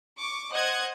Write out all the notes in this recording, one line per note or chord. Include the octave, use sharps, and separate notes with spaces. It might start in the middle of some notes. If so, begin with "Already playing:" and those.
C#6 D6
C5 D#5 F#5 F#6 G#6